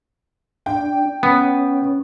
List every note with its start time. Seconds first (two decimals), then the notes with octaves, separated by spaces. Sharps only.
0.66 D4 G5
1.23 B3 C#4